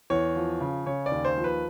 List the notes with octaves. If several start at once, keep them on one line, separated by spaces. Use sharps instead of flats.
E2 C#5
F3
C#3
C#3 C#5
D5
D#2
C5
F3
B4